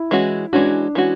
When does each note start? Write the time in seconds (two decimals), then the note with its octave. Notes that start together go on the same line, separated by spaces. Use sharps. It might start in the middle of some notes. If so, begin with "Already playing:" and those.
Already playing: E4
0.11 E3 G#3 C#4 F#4
0.53 E3 G#3 C#4 D4 F#4
0.95 E3 G#3 C#4 F#4